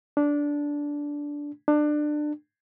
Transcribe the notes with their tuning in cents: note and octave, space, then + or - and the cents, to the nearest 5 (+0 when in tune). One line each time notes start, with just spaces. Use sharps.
D4 -10
D4 +25